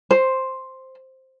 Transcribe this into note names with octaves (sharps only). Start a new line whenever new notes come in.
C5